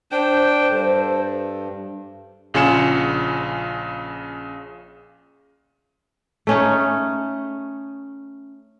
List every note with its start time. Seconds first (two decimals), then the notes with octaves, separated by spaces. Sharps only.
0.12 D4 C5 G5
0.71 G2 A4
2.54 A#1 C#3 F4 G#5 C#7 E7
6.47 A3 C#4 D#4